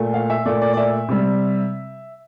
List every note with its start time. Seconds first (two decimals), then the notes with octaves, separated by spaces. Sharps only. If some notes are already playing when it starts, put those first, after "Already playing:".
Already playing: A#2 A3
0.14 F5
0.30 E5
0.45 A#2 A3 D5
0.61 D5
0.73 D5
0.77 E5
1.09 C3 G3